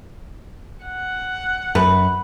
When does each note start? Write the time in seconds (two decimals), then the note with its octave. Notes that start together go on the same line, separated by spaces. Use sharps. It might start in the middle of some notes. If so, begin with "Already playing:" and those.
0.85 F#5
1.75 F#2 B4